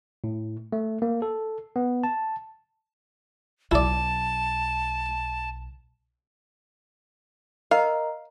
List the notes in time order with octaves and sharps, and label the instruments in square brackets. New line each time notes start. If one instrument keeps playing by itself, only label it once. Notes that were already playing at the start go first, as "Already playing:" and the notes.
[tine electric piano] A2
A3
A#3
A4
B3
A5
[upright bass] B1 [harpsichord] E4 D5 [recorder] A5
[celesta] A#4 D#5 A#5 [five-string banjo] F5